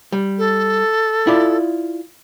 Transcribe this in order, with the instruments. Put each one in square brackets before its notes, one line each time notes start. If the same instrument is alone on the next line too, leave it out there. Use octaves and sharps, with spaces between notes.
[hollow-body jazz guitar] G3
[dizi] A4
[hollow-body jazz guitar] E4 F4 D5